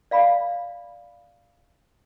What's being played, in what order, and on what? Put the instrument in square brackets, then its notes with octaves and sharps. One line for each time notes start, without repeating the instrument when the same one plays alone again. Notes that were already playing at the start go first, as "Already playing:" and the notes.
[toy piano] D5 F5 B5